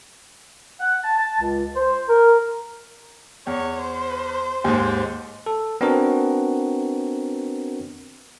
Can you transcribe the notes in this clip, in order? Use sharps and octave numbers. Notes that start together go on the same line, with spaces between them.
F#5
A5
A5
C#2
C5
A#4
E2 C#5
C5
D#2 G#2 C5
A4
B3 C4 D4 F#4 A#4